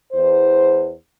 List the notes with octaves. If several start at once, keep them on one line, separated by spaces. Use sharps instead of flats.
E2 C5